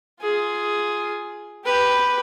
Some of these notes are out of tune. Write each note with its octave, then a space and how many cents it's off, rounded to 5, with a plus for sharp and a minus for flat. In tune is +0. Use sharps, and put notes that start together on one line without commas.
F4 +0 G#4 +5
G4 +0 B4 +0